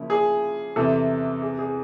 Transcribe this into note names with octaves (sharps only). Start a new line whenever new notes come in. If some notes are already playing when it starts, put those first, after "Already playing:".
Already playing: C#3 F3 A#3 C#4 E4
G#4
E2 C3 E3 A4
G#4
G#4